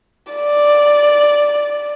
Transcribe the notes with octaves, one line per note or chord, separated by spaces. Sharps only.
D5